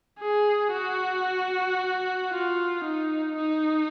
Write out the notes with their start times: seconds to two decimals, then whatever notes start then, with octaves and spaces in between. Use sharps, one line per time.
0.20 G#4
0.73 F#4
2.31 F4
2.84 D#4
3.37 D#4